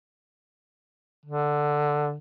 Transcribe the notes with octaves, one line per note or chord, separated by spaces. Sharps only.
D3